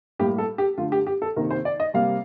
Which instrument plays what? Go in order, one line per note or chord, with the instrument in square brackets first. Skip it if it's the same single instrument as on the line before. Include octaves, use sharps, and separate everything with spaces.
[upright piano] A2 G3 A#3 G4
A4
G4
D3 A3 F4
G4
G4
A4
C3 D#3 A#3 A#4
C5
D5
D#5
C3 G3 A#3 F5